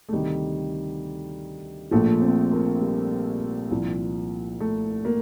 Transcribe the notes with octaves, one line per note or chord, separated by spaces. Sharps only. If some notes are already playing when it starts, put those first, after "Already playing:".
A3
D2 C3 D#3 G3
A#1 A#2 F3 A3
C4
A#3
G3
C2 A#2 F3
A3
A#3